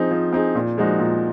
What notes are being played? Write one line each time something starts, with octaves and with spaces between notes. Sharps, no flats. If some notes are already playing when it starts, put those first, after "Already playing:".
Already playing: F3 C4 D#4 G#4
F3
C4 D#4 G#4
A#2
F3 G#3 D#4 F#4
A#2